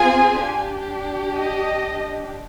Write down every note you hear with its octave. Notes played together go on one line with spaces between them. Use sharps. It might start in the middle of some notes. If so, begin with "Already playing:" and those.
Already playing: C4 F4 G#4 G#5
D4 G4
D#5